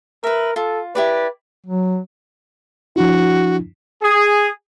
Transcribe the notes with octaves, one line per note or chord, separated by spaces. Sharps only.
A#4 B4 E5
F4 A4
E4 G4 B4 D5
F#3
F3 D4 E4 F#4
G#4